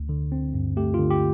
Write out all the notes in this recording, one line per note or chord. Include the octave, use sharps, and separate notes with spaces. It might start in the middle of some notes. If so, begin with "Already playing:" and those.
Already playing: D2
D3
C4
G2
A3 G4
F4
D3
G4